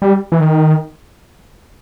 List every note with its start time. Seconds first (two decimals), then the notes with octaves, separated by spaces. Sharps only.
0.02 G3
0.32 E3
0.40 D#3